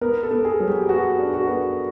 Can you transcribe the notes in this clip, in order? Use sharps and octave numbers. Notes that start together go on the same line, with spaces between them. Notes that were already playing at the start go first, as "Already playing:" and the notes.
B3 A#4
A4
B3
G#4
F#3
G4
B3 F#4
D4
F#4
B3